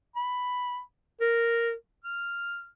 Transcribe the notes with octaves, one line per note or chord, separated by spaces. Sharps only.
B5
A#4
F6